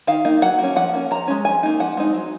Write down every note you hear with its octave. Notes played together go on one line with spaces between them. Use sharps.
D#3 F5
A#3 D#4
F#3 F#5
A#3 C#4
F3 F#5
A#3 C#4
F3 A#5
G#3 C#4
F3 G#5
A#3 D#4
F3 F#5
G#3 C4 D#4
F#3